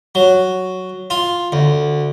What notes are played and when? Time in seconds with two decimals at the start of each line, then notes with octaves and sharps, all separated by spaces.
0.15 F#3
1.10 F4
1.52 D2